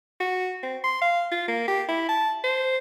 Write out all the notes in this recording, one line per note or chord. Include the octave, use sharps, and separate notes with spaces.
F#4
C4
C6
F5
F4
A#3
G4
E4
A5
C5